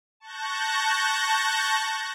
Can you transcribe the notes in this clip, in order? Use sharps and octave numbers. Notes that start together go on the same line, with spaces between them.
A5 C#6 F#6 G6 A#6